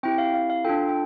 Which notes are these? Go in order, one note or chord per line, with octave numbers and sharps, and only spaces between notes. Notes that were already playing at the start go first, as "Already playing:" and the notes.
C4 E4 G4 G5
F5
F5
F5
D4 F4 A4 G5
G5